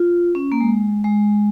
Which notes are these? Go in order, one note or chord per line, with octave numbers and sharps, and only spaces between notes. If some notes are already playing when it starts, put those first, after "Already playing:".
Already playing: F4
C#4
A#3
G#3
G#3